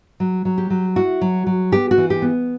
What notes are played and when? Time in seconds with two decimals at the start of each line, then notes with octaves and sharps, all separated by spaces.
0.20 F#3
0.45 F#3
0.58 G4
0.70 F#3
0.96 E4 F#4
1.21 F#3
1.47 F#3
1.72 B3 G4
1.91 F#4
1.98 E3
2.10 G4
2.22 B3